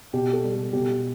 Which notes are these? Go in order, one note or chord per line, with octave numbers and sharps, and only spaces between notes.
B2 G4
A4
G3
A4
B2 G4